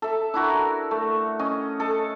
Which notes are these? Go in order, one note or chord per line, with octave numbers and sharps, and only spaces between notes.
A4 E5
D4 E4 F#4 A#4
A3
C#4 D#5
A4 D#5